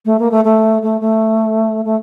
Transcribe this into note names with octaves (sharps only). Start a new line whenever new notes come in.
A3
A#3
A3
A3
A3
A3
A3